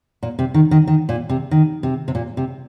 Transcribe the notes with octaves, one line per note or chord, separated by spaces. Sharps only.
A#2
C3
D#3
D#3
D#3
A#2
C3
D#3
C3
C3
A#2
C3